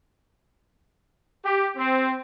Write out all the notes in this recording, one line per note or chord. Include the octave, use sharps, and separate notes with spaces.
G4
C4